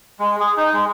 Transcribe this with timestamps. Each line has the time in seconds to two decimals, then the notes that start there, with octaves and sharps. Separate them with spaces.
0.20 G#3
0.40 G#4
0.57 D#4
0.73 G#3